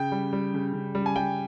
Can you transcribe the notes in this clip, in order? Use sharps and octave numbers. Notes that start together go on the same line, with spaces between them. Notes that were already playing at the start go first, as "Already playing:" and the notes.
Already playing: C#3 G5
G3
G3
C#3
C#3
G3
G#5
G3 G5